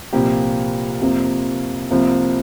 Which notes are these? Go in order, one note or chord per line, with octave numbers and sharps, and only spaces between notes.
C2 A#2 F3 A#3 G4
F2 C3 F3 A#3
C2 C3 F3 A#3